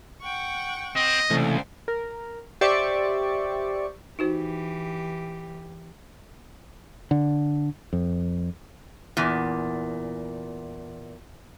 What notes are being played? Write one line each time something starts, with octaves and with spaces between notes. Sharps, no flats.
F#5 G5 C#6
C4 D#5
C#2 C3 E3 A3 C5 D5 G#5
A#4
G4 C5 D5 E5 C#6
E3 D#4 F#4 G4 C5
D3
F2
E2 A#2